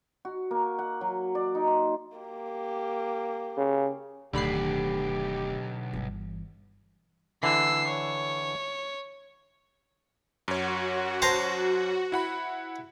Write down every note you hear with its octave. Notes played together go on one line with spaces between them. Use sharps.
F#4
A#3
F#5
F#3
D5
D#4
C6
A#3 G4
C#3
D1 B1 D3 D#3 G4 B5 C7
G1 E3
D3 E3 E6 C7
C#5
F#2 F#4 C#5
C5 A5 A#5
E4 F#5 B5